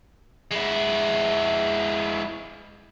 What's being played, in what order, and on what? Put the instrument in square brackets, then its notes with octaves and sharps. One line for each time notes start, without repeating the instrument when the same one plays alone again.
[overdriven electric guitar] G#3 E4